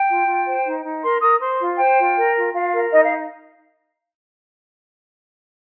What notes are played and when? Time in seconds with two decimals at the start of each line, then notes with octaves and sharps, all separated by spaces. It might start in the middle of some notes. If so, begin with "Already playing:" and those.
Already playing: G5
0.08 F4
0.27 F4
0.46 C5
0.65 D#4
0.84 D#4
1.03 A#4 C6
1.21 A#4 D#6
1.41 C5 C6
1.59 F4
1.78 C5 G5
1.97 F4
2.16 A#4
2.35 F4
2.53 F4 F5
2.73 A#4
2.91 D#4 D#5
3.04 F5